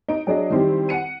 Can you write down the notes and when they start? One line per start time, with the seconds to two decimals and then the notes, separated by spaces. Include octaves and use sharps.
0.08 D#4 D7
0.27 F#3 D4 G#4 D#5
0.50 D#3 G3 C4 E4 G4
0.89 F#5 C#7 D#7